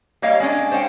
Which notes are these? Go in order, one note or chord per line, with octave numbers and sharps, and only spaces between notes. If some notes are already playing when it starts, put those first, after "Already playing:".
G3 A#3 C#5 D#5 F5
G#3 C#4 D4
C5 C#5 D#5 F5 G5